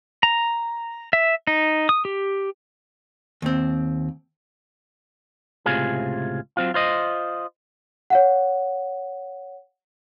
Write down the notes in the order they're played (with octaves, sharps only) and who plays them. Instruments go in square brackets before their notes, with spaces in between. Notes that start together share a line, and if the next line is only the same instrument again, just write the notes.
[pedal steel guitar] A#5
E5
D#4
D#6
G4
[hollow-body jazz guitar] D#2 C4
[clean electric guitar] C#2 A2 C3 F4 G#4
F#3 C4 F4
F4 C5 D#5
[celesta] C#5 F5 F#5